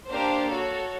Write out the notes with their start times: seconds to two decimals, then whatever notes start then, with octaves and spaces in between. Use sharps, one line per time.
0.09 A#3 D4 G4 C5 F5
0.50 F#4 A4 C#5